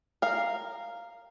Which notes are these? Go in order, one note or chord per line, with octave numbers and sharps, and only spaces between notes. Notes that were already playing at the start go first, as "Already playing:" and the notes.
A#4 F5